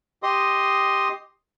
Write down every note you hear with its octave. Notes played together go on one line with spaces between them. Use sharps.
G4 D#5 C6 D#6